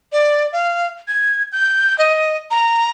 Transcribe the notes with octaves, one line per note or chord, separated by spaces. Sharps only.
D5
F5
G#6
G6
D#5
A#5